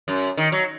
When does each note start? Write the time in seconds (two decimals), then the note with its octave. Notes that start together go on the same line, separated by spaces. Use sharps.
0.08 F#2
0.37 D#3
0.52 F#3